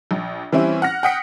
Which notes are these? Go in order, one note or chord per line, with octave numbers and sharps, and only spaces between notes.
A#1
E3 G3 C4 C#4 E4
F#5 F6 A#6
F#5 G5 D#6 B6 C#7